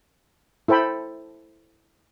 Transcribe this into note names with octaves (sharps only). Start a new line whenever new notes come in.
E4 A4 C5 G5 B5